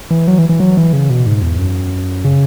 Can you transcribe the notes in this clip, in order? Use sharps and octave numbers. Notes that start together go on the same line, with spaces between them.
E3
F#3
E3
E3
F#3
E3
C#3
B2
G#2
E2
F#2
C#3